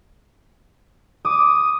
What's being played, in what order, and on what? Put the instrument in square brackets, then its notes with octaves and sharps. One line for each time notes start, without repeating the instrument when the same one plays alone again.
[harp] D6 [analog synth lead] D#6